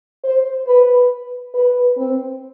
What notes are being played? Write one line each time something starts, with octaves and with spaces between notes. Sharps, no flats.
C5
B4
B4
C4